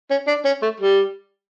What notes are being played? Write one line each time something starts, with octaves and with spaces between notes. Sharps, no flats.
C#4
D4
C#4
A3
G3